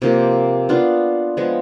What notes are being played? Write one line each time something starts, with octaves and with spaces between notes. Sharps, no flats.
C3 F3 A#3
B3 D4 F4
F3 G#3 B3